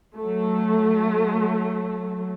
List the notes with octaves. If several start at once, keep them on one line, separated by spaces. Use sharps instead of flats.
F#3 A3